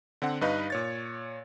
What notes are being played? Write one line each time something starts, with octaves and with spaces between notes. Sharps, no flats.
D3 C4 F#5
G2 D#4 B4 D#5 F5
A#2 C#5 A6